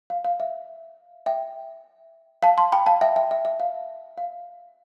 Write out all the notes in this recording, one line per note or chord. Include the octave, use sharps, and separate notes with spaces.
F5
F5
E5
E5 G5
F5 A5
A5 C6
G5 B5
F5 A5
E5 G5
E5 G5
E5
E5
F5
F5